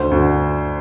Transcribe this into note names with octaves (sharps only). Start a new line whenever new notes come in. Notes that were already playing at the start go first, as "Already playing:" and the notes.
Already playing: D2 C5
D2